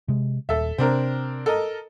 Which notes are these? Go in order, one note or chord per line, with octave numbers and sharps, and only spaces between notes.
C3 G#3
D#1 A4 E5
C3 C4 D4 A#4
A4 A#4 D#5